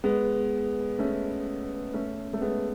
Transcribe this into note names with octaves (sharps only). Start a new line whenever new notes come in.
G#3 B3
A3 C#4
A3 C#4
A3
G#3 B3